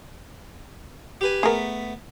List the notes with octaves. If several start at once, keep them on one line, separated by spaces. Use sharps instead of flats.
G4 B4 G#5
A3 B3 G#4 A#4